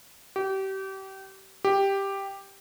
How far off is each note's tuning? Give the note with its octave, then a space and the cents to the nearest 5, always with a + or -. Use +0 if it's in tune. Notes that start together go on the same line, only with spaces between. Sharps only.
G4 -30
G4 +5